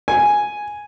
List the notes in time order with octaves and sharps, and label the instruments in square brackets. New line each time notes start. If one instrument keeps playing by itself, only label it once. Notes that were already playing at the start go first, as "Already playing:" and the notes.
[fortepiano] G#5